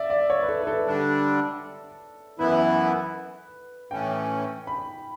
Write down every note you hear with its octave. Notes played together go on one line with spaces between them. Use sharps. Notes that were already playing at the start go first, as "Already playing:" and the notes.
Already playing: D5 E5
D5
C#5
B4
A4
B4
A4
D3 G3 D4
F#2 E3 B3 E4 B4
A2 E3 A3 C#4 G5
B5